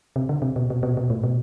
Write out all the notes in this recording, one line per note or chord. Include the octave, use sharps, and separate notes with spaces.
C3
D3
C3
B2
B2
B2
B2
A2
B2